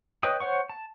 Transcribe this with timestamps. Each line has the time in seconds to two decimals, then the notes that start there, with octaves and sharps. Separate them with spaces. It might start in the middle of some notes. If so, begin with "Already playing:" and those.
0.23 B4 C#5 D#5 G5 D#6
0.40 C5 C#5 F#5 C#6
0.69 A5